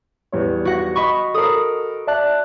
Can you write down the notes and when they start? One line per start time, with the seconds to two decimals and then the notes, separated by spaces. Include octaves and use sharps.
0.32 E2 G3 C#5
0.65 F#4 F#5 A#6
0.96 D#5 B5 C#6
1.34 A4 A#4 D#6 C7
2.07 D5 E5 A5 F#6